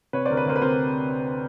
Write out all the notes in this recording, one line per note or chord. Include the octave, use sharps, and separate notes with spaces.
C3 B4 C#5
C5 D5
D2 A#4
B4
D2 A#4 C5
B4
C3 A#4 C5